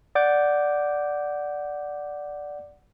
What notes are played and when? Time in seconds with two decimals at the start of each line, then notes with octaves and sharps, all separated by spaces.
0.15 D5 F#5 D6 G6